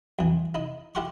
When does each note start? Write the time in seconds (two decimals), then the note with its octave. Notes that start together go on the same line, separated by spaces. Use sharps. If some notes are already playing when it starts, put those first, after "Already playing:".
0.19 F2 E3
0.55 D#4 E4
0.95 E4 G4 F5 F#5 C6 C#6